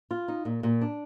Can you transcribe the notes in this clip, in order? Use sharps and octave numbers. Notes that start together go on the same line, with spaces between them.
F4
D#4
A#2
A#2
D4